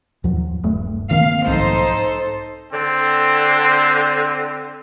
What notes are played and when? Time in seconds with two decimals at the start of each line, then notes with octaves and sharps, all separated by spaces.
0.24 D#2 F3 F#3
0.63 D#1 G2 A3
1.11 D#3 A#3 C4 F5
1.47 B1 G#2 F3 D#4 A4 C5
2.73 D3 C4